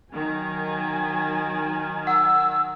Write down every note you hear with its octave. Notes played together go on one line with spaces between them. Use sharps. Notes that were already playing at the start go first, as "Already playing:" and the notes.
D#3 F#3 G#5
F#5 E6